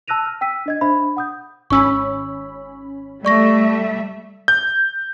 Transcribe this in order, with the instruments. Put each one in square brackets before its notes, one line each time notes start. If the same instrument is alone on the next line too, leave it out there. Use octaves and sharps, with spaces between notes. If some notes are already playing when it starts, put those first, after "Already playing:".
[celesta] A5 E6 F#6 A#6 D#7 F7
F6
G5 E6 B6 D#7
D4 D#5 G#6
D4 C5 E5 B5
F#5 D#6 G6
[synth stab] G#1 C#4 B5 [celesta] C#6 E6
[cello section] G3 A3 E5 [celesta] D5 C#6 A#6
[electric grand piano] G6